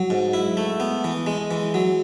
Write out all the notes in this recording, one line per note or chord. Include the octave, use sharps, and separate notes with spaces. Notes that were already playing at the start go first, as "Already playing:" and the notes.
Already playing: F#3
G#2
E4
A3
B3
E3
G#3
E3
F#3